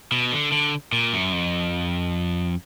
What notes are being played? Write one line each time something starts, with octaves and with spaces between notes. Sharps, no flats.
B2
D3
D3
A#2
F#2
F2